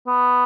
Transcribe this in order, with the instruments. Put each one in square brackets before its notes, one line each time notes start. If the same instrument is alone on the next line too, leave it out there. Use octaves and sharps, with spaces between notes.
[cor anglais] B3